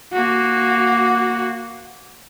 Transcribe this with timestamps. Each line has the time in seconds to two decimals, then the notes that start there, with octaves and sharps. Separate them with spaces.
0.13 A#3 F#4